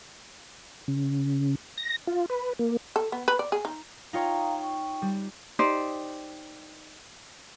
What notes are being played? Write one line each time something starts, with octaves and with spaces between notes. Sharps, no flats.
C#3
A#6
F4
B4
A#3
A4
B3
B4
D5
G#4
D#4
D#4 F4 C#5 F5 G5 A#5
G5 C#6
G3
D#4 G4 C5 D5